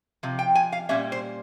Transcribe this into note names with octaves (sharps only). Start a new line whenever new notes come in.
C3 F3
G5
G#5
F5
A#2 G3 A#3 C#4 E5
C5